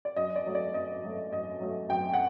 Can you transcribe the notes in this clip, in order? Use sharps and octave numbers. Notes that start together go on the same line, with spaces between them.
D5
F#2 D#5
D5
F#3 A3
D5
F#2 D#5
F#3 A3
F#2 D#5
F#3 A3
F#2 G5
F#5